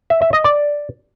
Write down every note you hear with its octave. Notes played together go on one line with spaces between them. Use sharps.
E5
E5
D#5
D5